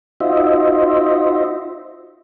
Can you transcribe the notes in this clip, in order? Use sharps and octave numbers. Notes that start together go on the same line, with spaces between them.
D#4 F4 F#4 C5 D#5 E5